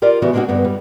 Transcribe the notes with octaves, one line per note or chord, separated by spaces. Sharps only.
F4 G4 A#4 D5
C#3 E3 B3 F#4
G#3 A#3 C4 D4 D#4 F#4
G2 D3 B3
G3